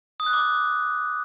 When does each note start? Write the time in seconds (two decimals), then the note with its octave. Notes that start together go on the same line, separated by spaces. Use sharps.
0.20 D#6
0.26 F#6
0.33 D6